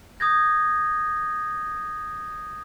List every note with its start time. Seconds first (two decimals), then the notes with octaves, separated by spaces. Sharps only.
0.20 D#6 G6 G#6 A#6